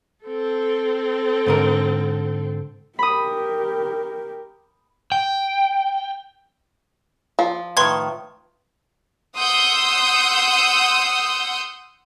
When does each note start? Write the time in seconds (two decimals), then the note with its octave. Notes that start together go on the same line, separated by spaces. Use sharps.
0.25 C4 A4
1.47 G#2 D3 A#4
2.99 G4 A#4 B5 D#6
5.12 G5
7.39 F3
7.77 A2 D#3 B4 C6 G#6
9.37 F#5 C6 D#6 E6 G6